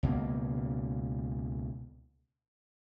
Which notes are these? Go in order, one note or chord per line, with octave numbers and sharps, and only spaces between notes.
C#2 B2 A#3